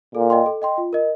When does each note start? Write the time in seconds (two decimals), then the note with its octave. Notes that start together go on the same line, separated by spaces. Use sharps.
0.15 A#2 A4
0.30 D#5 G5 C6
0.46 A4
0.62 D#5 G5 C6
0.78 F4
0.93 A#4 D#5